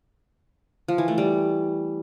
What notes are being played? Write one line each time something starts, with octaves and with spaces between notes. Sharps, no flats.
F3
E3
A3
G3